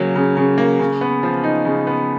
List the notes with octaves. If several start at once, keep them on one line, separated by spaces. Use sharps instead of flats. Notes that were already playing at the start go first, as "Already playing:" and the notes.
Already playing: C#3 F#3 A#3
C#3
C#3
A#3
C#3
B3
F3
D#4
C#3
B3